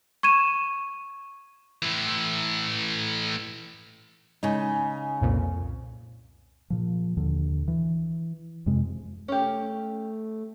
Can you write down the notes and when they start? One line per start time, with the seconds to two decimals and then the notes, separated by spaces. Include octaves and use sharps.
0.23 C#6 G#6 D#7 E7
1.82 A2 E3
4.43 C#3 G#3 D#4
5.21 C2 F2 A#2
6.70 A#2 F3
7.17 D#2 D3
7.68 E3
8.66 F2 C3 G#3
9.28 A3 C#4 G4